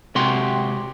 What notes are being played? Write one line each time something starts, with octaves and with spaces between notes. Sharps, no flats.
C3 G#3 F#4 G4 C6